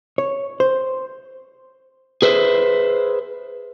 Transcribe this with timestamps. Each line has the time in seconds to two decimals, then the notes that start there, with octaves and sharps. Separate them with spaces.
0.18 C#5
0.60 C5
2.22 G#4 B4 C5 E5